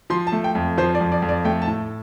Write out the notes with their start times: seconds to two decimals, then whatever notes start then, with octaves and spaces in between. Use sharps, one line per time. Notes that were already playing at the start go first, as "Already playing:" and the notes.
0.10 F3 C6
0.27 A5
0.32 A3
0.44 G5
0.55 F2
0.78 F3 C5
0.95 D5
1.01 F2
1.12 D5
1.22 F2
1.29 D5
1.45 A3 G5
1.62 A5
1.67 A2